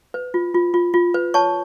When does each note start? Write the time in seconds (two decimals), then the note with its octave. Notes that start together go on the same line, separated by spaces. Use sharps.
0.14 B4
0.34 F4
0.54 F4
0.74 F4
0.94 F4
1.14 B4
1.34 C#5 A5 C#6